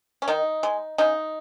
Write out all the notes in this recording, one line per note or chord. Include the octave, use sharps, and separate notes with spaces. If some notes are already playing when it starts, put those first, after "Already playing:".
C#4
D#3 D#4
G#3
C#3 D#4